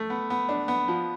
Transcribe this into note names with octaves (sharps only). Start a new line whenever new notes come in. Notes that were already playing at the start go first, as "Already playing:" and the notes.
Already playing: A3
B3
B3
D4
B3
F3